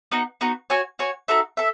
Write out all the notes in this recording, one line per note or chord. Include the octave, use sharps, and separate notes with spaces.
B3 D#4 F#4
B3 D#4 F#4
F#4 C#5 G#5
F#4 C#5 G#5
D#4 F#4 A4 E5
A4 E5